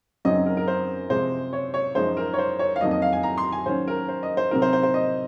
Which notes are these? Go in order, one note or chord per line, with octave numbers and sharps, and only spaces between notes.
F#2 C#3 F#3 C4 D#4 D#5
A#4
A#4
C5
C3 F3 G#3 C5
C#5
C#5
F#2 F3 G#3 D#4 C5
A#4
C#5
C5
C#5
F5
F2 D#3 F#3 A#3 D#5
D#5
F5
G#5
A#5
C6
G#5
D#3 F#3 C#4 C5
A#4
C5
D#5
C5
C3 F#3 C4 D#4 A#4
C5
C5
C5
D#5